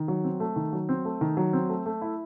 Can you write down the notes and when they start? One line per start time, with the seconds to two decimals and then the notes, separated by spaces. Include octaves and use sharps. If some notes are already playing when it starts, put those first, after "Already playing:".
Already playing: D#3
0.08 F#3
0.24 C4
0.40 A3
0.56 D#3
0.73 F#3
0.89 C4
1.05 A3
1.21 D#3
1.37 F#3
1.53 C4
1.69 A3
1.86 A3
2.02 E4